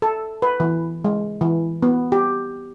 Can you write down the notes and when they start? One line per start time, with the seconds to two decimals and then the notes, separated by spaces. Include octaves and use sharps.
0.02 A4
0.42 B4
0.60 E3
1.04 G#3
1.41 E3
1.82 B3
2.12 G4